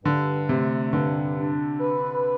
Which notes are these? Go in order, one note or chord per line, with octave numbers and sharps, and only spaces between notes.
G2 D3
C3 A3
G2 D3
D4
B4